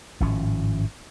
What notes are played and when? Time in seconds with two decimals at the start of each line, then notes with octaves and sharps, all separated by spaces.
0.20 G#1 A2 F3 C#4